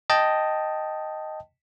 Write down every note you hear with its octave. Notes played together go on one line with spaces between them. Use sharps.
D#5 G5 A5